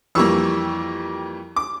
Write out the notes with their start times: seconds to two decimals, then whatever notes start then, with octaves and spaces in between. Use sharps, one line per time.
0.15 F2 E3 G3 A#3 C#6 E6
1.56 D6